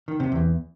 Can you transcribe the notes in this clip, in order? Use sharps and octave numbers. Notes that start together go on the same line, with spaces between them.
D#3
C3
E2